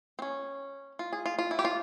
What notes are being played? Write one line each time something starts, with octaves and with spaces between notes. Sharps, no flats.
C4
C#4
F4
G#4
F4
F4
E4
G4
F4